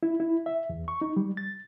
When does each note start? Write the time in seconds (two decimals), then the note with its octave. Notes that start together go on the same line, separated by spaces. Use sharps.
0.03 E4
0.20 E4
0.46 E5
0.70 E2
0.88 C#6
1.01 D#4
1.17 G3
1.37 A6